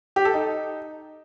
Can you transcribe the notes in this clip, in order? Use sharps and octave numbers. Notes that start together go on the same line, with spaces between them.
G4
A4
D#4